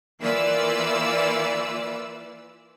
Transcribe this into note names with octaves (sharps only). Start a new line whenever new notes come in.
E3 A#3 F4 B4 D5 E6